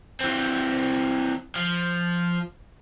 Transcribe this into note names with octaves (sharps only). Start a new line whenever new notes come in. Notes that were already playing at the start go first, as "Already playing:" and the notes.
E3 C4
F3